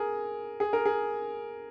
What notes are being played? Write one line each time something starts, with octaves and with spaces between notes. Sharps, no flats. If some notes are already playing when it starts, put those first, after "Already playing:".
Already playing: G#4 A#4
G#4
A#4
G#4